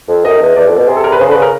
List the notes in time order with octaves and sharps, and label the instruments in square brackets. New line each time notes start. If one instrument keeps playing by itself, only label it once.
[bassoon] F2
[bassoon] F#2 [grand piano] D#5
[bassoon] E2
[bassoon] E2 [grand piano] D5
[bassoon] F2
B2
[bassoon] C3 [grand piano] G#4
[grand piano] A4
A#4
B4
[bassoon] C#3 [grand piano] C5
[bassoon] D3
[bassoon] C#3 [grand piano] B4
[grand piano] A#4